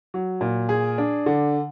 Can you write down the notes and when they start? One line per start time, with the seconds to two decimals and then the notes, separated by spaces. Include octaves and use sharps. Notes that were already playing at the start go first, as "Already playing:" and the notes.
0.14 F#3
0.41 A#2
0.69 G#4
0.98 D4
1.26 D3